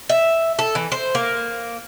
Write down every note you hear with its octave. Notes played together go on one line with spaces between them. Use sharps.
E5
A4
E3
C5
A#3